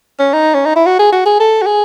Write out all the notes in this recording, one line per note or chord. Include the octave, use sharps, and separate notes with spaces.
C#4
D#4
C#4
D#4
E4
F#4
G#4
F#4
G#4
A4
F#4
G#4